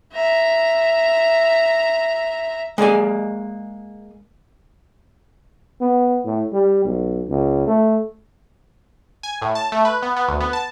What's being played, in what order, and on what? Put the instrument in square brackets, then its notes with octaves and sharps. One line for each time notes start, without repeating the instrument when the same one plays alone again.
[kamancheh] E5 A#5
[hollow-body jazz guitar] G#3 A#3 D5 G#5
[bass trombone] B3
A2
G3
B1
C#2
A3
[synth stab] G#5
A2
A5
A3
B4
B3
B3
D2
B3
A5